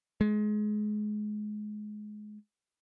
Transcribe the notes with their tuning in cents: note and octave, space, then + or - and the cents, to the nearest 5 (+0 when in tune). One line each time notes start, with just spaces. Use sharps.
G#3 +25